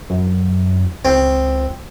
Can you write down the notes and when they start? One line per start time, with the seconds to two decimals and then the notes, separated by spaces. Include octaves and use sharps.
0.10 F#2
1.05 C#2 C4